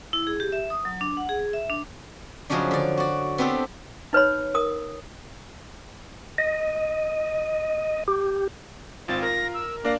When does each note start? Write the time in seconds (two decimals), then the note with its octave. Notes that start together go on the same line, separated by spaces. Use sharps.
0.13 E4
0.27 G#4
0.40 G4
0.52 E5
0.70 D#6
0.85 F#3
1.01 D4
1.17 F#5
1.29 G#4
1.53 E5
1.70 D4
2.50 C#3 F3 F#3 G#3 C#4 D4
2.71 D3 D5
2.97 F#4 D5
3.38 B3 C4 D4 G4 A4
4.13 D#4 B4 C#5 B5
4.54 A#4 D#6
6.38 D#5
8.08 G4
9.08 G#1 C4 F4 A6
9.23 A#4 A#6
9.54 E6
9.85 A#3 D4 D5 F5 A#6